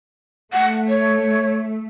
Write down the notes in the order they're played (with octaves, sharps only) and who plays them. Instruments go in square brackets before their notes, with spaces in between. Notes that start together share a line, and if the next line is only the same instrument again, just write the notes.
[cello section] A3 [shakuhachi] F#5
[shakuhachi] C#5